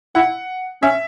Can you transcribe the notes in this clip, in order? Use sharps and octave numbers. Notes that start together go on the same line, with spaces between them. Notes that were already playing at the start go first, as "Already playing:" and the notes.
E4 F#5
C#4 E5